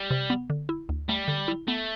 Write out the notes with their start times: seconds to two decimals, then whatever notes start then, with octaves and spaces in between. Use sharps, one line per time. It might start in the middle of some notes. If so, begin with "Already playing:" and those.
Already playing: G3
0.11 C3
0.30 B3
0.50 D3
0.69 E4
0.89 D2
1.09 G3 A3
1.28 D3
1.48 E4
1.68 A3 B3